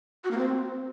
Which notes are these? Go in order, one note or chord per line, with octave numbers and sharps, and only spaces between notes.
F#4
A#3
C4